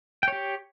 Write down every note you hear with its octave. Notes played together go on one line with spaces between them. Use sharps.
G4 C#5 G5